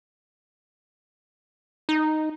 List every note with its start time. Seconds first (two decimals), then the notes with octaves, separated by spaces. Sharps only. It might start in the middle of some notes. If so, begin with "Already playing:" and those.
1.89 D#4